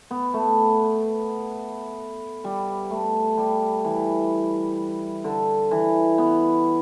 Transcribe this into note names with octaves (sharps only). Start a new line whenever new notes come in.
B3
A3
G3
A3
G3
E3
D3
E3
B3